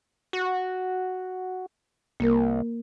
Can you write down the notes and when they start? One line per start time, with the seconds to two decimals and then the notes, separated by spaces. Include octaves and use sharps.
0.33 F#4
2.20 C2 A#3 A#4